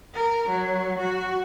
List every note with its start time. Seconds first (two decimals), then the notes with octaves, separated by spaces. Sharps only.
0.14 A#4
0.49 F#3
0.99 F#4